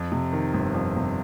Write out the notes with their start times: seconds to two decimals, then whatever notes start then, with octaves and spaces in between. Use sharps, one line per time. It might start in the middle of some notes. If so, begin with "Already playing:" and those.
Already playing: F2
0.12 C3
0.33 D#3
0.54 G1
0.74 F2
0.96 C3